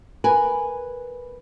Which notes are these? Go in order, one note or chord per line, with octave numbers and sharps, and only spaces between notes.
A#4 B4 G#5